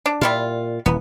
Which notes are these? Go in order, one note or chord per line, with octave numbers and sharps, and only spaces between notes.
D4
A#2 G3 E4 F4
D#1 E3 B3